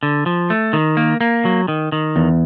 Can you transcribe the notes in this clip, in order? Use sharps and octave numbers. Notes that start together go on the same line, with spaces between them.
D3
F3
A3
D#3
A#3
A#3
F#3
D#3
D#3
E2